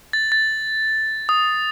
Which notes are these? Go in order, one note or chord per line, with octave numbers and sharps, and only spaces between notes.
A6
A6
D#6